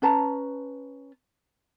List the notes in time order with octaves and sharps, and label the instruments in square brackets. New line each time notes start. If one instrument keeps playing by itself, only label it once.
[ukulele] C#4 B4 A5 A#5